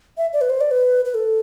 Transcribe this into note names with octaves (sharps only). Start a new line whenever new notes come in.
E5
D5
B4
C5
D5
B4
B4
A4